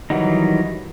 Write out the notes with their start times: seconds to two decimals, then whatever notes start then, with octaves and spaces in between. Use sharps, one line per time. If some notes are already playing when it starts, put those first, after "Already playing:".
0.10 D#3 E3 F#3 G3 D#4